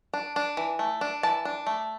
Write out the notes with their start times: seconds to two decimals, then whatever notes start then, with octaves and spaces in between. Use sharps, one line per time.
0.13 D4
0.36 D4
0.57 E3
0.79 A3
1.01 D4
1.23 E3 A5
1.45 D4
1.67 A3